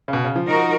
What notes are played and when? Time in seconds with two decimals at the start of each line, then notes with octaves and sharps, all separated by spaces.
0.08 C#3
0.13 B2
0.24 C#3
0.36 F3
0.47 D#4 F#4 A#4